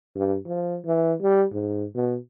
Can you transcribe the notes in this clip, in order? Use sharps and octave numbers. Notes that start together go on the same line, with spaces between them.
G2
F3
E3
G3
G#2
B2